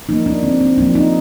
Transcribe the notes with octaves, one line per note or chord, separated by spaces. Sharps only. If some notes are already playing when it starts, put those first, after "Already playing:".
F3 A#3 D#4
D4
D3 C4
C4
F3 A#3 D4
D#4